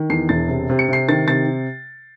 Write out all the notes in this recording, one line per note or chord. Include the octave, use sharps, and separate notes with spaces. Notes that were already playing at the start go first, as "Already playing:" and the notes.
Already playing: D#3
E2 C7
E1 A6
C3
C3
C#7
C3 C7
D#3 A6
C3 A6